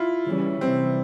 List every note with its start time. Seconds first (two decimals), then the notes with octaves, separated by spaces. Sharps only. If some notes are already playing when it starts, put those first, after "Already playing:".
Already playing: E4 F4
0.26 C#3 E3 G3 C#4
0.61 C3 E3 G3 C4